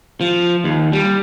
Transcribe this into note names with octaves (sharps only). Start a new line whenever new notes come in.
F3
D#2
G3